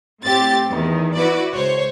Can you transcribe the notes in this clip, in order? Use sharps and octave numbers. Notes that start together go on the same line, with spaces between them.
A2 C4 G4 A6
E2 D#3
E4 F#4 B4 D5
C#2 C5 C#5